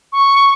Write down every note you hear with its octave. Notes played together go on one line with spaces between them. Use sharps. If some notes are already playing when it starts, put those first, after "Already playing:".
C#6